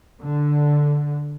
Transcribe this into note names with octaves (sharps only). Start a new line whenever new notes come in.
D3